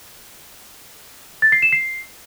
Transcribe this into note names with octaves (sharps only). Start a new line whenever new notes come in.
A6
C7
E7
C7